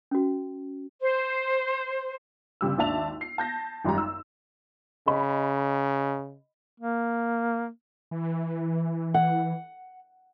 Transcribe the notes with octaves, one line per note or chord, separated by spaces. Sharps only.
C#4 F#4
C5
G1 C#3 G3 E6
G#1 D#2 D4 E5 A5 F7
C7
A5 G6 A#6
G#1 F#2 G3 A#5
E6
C#3 D#5 B5
A#3
E3
F#5